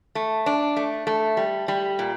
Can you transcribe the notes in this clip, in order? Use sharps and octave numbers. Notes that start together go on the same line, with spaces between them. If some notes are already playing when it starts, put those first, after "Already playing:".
A3
D4
A3
A3
G3
G3
A#2